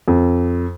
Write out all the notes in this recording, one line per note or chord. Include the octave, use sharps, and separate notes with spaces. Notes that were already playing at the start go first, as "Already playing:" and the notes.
F2